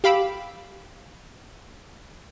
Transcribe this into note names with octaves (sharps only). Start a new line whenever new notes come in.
G4 F5 B5 D6 E6